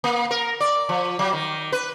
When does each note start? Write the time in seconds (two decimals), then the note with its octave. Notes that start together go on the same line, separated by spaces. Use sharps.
0.04 A#3
0.31 A#4
0.60 D5
0.89 F3
1.19 F#3
1.33 D#3
1.72 B4